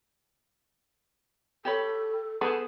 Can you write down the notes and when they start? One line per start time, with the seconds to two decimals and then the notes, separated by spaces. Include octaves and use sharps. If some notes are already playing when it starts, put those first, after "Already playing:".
1.65 G4 A4 C#5 B5
2.41 B3 G#4 A4 B4 C5